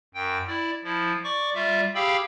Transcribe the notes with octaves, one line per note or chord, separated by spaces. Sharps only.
F#2 G5
E4 D5
F3 E4
D5 C#6 D6
G3 F4 D5 E5
G4 G#4 F5 G5 B5 E6